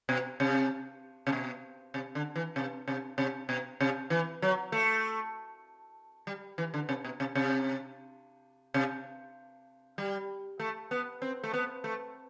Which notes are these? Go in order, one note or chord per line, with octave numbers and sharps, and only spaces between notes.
B2
C3
C3
B2
C3
D3
E3
C3
C3
C3
B2
C3
E3
F#3
A3
G3
E3
D3
C3
B2
C3
C3
C3
G3
A3
B3
C4
A3
B3
A3